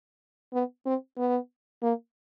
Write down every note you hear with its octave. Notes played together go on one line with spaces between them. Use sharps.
B3
C4
B3
A#3